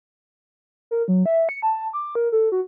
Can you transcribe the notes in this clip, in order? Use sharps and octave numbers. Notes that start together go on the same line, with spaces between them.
A#4
F#3
E5
C#7
A5
D6
A#4
A4
F#4